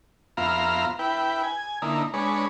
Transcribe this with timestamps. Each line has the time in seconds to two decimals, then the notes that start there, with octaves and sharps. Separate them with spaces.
0.37 F2 B3 F4 E5 F5 A#5
0.99 E4 B4 G5
1.43 G#5
1.82 D3 A#3 D#4 E4
2.14 G#3 D4 B4 C#5